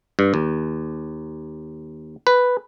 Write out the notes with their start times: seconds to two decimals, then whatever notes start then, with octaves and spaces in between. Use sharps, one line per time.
0.19 G2
0.34 D#2
2.27 B4